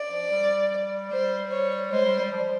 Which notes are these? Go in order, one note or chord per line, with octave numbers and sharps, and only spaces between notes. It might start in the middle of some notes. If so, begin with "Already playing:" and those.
Already playing: D5
F3
G3
G3 C5
C#5
G#3 C5
G3
G3
F3